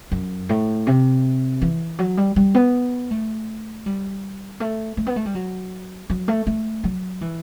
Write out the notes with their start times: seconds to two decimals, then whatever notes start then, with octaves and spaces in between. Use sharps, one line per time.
0.12 F#2
0.49 A2
0.87 C3
1.62 E3
1.99 F#3
2.17 G3
2.36 G3
2.54 B3
3.11 A3
3.86 G3
4.60 A3
4.97 A3
5.06 B3
5.16 A3
5.25 G3
5.35 F#3
6.10 F#3
6.28 A3
6.47 A3
6.84 F#3
7.21 E3